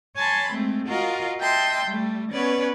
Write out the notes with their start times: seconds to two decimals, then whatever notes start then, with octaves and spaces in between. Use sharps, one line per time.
0.17 C#5 G#5 A5 B5 C6
0.52 G#3 A3 C4
0.88 F4 F#4 A#4 D#5 F5
1.39 D#5 E5 G5 A5 C6
1.86 G3 A3
2.32 B3 C#4 B4 C#5 D5